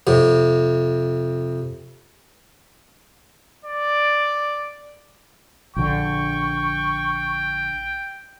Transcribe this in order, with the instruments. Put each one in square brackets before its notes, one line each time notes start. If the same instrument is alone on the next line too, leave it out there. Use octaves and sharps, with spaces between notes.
[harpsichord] F2 C3
[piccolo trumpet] D5
[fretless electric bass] A#1 D3 [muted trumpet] G5 [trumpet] C#6